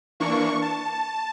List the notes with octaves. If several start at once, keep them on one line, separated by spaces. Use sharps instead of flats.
E3 A#3 D4 C#6
A5